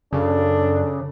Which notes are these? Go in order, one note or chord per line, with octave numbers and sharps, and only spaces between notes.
F#2 C#3 D4 A4